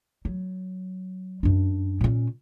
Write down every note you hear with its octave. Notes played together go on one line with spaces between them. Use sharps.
F#3
F#2 D4
A#2 C#4